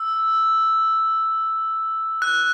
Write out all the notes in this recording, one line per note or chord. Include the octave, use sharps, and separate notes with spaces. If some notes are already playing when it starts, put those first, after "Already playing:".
Already playing: E6
F#6